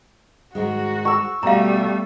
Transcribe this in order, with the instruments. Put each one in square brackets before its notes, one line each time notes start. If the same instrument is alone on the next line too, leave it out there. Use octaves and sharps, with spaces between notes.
[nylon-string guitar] G#2 D#3 G#3 [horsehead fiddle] F#4
[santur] C#6 E6
[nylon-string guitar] B2 [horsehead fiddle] G3 A3 [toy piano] F5 A#5